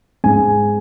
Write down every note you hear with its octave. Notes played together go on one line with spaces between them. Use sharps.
G#2 G#3 G#5